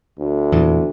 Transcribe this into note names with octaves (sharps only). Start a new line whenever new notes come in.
D2
E2 A#2 E3